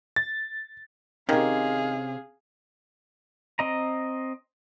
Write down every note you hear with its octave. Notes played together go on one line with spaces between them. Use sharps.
A6
C3 D#3 C#4 G#4 F5
C4 D#5 A#5